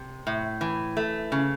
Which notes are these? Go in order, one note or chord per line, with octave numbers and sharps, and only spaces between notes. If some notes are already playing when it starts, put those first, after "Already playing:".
Already playing: C3
A2
E3
A3
C#3